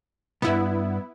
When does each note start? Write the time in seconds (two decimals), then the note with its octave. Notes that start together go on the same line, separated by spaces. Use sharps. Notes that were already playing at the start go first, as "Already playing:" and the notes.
0.42 B1 G2 B3 E4